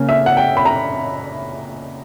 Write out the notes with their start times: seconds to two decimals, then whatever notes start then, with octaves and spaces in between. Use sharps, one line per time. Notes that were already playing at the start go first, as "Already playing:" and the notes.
Already playing: C#3 A#3 C#4
0.09 E5
0.26 F#5
0.37 G5
0.57 B5
0.65 A#5